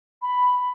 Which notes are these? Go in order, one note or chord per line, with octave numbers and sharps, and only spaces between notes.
B5